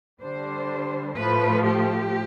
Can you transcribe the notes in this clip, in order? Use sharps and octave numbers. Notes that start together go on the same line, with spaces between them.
D3 G3 D4 C5
A2 F3 A3 B4
G4